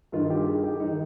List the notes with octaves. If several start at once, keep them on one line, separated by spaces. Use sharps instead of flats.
G2 D#3 F4
G4
G#4
G4
D#3 D#4